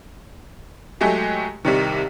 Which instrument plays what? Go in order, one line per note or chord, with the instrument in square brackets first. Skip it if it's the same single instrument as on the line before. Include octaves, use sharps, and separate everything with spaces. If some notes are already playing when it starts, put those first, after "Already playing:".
[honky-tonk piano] F#3 G#3 A3 G4
C2 C3 D#3